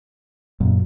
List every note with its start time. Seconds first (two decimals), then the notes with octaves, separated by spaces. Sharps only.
0.60 F#2 A#2